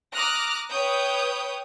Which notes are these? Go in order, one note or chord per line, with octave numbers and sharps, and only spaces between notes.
A#5 D6 D#6 F6 F#6 A#6
B4 C#5 G5 D#6 G6